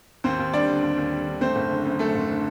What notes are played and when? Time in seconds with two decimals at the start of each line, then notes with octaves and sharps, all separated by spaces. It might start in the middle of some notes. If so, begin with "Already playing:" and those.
0.24 D#2 C4 C5
0.39 D#2
0.53 G3 D4 D5
0.68 D3
0.83 D#2
0.97 D#2
1.12 G3
1.26 D3
1.41 A3 C4 C5
1.56 F#1
1.71 D3
1.85 F#2
1.99 A3 A4
2.15 F#1
2.29 D3